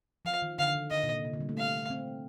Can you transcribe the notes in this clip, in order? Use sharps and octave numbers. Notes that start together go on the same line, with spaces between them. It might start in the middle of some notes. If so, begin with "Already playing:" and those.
F3 F5
D#3
D3 F5
D#3
D3 D#5
A#2
C3
C3
D3
G3
A3
F5
C4